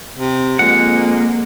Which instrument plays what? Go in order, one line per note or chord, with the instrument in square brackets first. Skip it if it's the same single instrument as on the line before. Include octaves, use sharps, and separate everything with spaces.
[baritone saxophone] C3
[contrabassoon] F2 [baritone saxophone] G#3 [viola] A#3 [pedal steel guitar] F#5